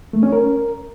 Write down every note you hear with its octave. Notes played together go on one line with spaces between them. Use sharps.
A3
C#4
A#4